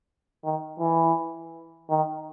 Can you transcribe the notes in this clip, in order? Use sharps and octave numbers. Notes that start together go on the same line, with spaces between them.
D#3
E3
D#3